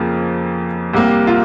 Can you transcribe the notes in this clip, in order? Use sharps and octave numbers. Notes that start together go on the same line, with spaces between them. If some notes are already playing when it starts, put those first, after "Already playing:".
Already playing: F2 C#3 F3 A#3
C2 C3 G3 A#3 G4
F4